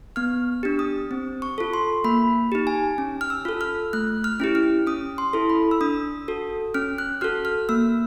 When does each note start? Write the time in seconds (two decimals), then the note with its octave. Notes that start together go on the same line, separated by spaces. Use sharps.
0.16 B3 F6
0.63 D4 G4
0.79 D#6
1.11 C4
1.42 C#6
1.58 F4 A4
1.74 C6
2.04 A#3 B5
2.52 D#4 G4
2.67 G#5
2.98 C#4
3.21 F6
3.30 E6
3.45 F4 A4
3.61 F6
3.93 A3 F#6
4.24 F6
4.40 C#4 E4 G4
4.55 F6
4.87 C#4 D#6
5.18 C6
5.33 E4 A4
5.50 B5
5.71 E6
5.81 D4 D#6
6.28 F#4 A4
6.74 C#4 F6
6.98 F#6
7.21 F#4 A4 F6
7.45 F6
7.69 A#3 E6